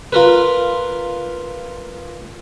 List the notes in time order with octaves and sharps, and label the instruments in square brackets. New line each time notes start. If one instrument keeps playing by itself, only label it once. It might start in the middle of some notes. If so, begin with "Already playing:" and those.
[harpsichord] F4 A#4 B4